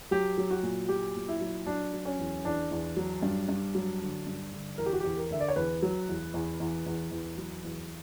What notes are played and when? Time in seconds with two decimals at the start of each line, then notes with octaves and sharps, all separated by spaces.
0.11 F#3 G4
0.38 F#3
0.51 F#4
0.63 A#2
0.89 F#3 G4
1.16 A#2
1.29 E4
1.41 F#3
1.66 F#3 D4
1.93 F#3
2.05 C#4
2.19 E2
2.44 E2 D4
2.71 E2
2.97 F#3
3.23 G2
3.49 G2
3.75 F#3
4.01 D3
4.27 G2
4.53 D3
4.78 E2 A#4
4.86 G4
4.93 F#4
5.00 E2 G4
5.17 A#4
5.30 D3 E5
5.40 D5
5.48 C#5
5.56 E2 B4
5.82 F#3
6.09 E2
6.34 E2
6.60 E2
6.86 E2
7.11 E2
7.37 F#3
7.64 E2